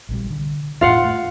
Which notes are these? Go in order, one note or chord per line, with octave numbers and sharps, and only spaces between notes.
A#1 C3 G3
D3
A1 F2 A2 F4 F5 F#5
A3